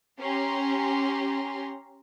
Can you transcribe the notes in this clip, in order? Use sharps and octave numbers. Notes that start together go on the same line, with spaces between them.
C#4 G4 A#5 C6